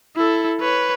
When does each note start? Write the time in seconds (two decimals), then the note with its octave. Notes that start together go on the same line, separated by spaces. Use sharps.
0.16 E4 A4
0.60 B4 C#5